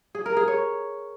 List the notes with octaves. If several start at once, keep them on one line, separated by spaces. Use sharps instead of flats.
G#4
A#4
G#4
C#5